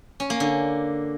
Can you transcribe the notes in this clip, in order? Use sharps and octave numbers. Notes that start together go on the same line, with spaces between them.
C#4
A#3
D3